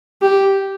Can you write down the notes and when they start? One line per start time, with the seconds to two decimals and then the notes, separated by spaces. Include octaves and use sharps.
0.22 G4